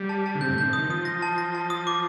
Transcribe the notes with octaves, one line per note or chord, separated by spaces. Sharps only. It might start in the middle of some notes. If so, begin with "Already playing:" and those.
Already playing: G3
A5
A5
D3
C3 G6
G2
A2
D3 G6
C3
D#3 D#6
F3 D#6
A#6
A5
A#6
A5
D#6
D6